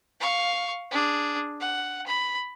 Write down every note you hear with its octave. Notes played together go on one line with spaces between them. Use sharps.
F5 C#6
D4 G#4
F#5
B5